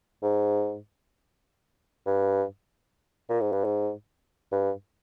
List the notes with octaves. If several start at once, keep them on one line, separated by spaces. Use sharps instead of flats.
G#2
G2
A#2
G#2
G2
G#2
G2